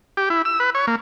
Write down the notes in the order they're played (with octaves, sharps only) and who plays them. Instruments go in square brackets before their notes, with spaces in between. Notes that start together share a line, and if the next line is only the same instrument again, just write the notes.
[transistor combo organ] G4
E4
E6
B4
C#5
A#3